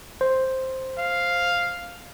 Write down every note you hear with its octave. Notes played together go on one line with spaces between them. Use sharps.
C5
F5